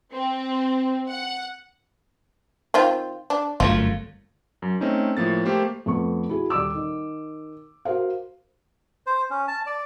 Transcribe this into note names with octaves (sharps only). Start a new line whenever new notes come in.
C4
F#5
D#3 C4 F4
D4
G1 F#2 A3 F4
F#2
A3 C4 C#4 D#4
A2 F3 A#3 A6
A3 A#3 G4 C5
F2 A3 B3 C#6
E4 F#4 G#4
D#1 G3 D5 D6 E6
D#3
F#4 A#4 C5 F5
C5
C#4
A5
D5